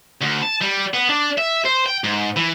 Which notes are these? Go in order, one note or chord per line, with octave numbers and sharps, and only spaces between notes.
D2
A5
G3
B3
D4
E5
C5
G5
G#2
E3